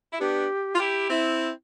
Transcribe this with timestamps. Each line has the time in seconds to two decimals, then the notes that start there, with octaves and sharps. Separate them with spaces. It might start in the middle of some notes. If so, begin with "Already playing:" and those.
0.13 E4
0.19 B3 D4 G4
0.75 F4
0.80 E4 G4
1.10 C4 E4